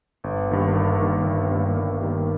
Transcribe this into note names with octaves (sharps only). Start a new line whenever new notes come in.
G1
G2 D#3 A#3
G1
G2 D#3 A#3
G1
G2 D#3 A#3
G1
G2 D#3 A#3